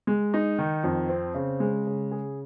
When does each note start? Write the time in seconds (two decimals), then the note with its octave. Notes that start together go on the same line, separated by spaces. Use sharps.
0.07 G#3
0.34 D#4
0.58 D#3
0.84 F2
1.09 C4
1.34 C#3
1.60 G#3
1.87 C#3
2.11 G#4